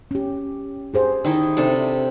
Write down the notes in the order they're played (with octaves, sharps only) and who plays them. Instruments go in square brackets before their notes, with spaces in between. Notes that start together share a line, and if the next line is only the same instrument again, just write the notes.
[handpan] C#4 G4
G4 G#4 C5
[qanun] D#3 D#4 E4
C3 D4 A4